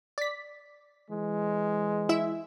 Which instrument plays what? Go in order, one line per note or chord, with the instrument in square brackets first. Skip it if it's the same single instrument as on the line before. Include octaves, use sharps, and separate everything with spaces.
[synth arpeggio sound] D5 B6
[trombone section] E3 G#3
[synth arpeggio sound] E4 E5